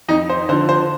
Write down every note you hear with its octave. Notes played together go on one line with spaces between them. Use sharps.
F2 D#4
C5
D3 F3 C5
C5